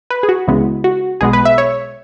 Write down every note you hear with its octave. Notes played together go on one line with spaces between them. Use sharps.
B4
G#4
F#4
C#2 C#3 E3 G#3 B3
F#4
B1 B2 G#3 B3 G#4
B4
E5
C#5